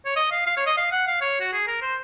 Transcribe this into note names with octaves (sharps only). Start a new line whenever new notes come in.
C#5
D#5
F5
F5
C#5
D#5
F5
F#5
F5
C#5
F#4
G#4
A#4
C5